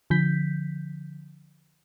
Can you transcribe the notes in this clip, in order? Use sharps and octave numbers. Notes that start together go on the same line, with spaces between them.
D3 F3 G6 B6